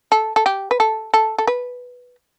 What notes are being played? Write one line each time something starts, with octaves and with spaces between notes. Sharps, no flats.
A4
A4
G4
B4
A4
A4
A4
B4